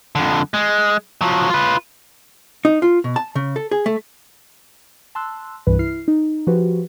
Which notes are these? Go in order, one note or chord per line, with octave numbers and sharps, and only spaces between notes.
F2 D3
G#3
F3 F#3
F4 B4
D#4
F4
B2
A5
C#3
A4
G#4
A3
A5 C6 E6 F#6
C2 G2 E3 B4
E4 F6 C7
D#4
F3 F#4 G4 B4